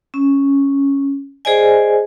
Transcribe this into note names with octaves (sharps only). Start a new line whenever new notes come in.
C#4
G#4 C5 D5 D#5 G#5